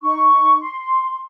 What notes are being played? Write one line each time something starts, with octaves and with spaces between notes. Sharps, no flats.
D#4 C#6
C6